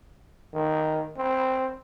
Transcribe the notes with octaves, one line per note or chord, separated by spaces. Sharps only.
D#3
C4